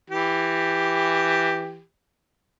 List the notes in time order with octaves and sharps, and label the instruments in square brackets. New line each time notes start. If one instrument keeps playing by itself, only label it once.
[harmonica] E3 G4